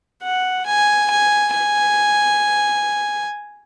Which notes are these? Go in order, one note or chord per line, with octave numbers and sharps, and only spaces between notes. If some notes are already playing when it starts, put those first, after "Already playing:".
F#5
G#5
G#5
G#5